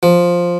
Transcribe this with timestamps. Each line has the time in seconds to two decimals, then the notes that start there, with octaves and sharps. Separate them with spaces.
0.03 F3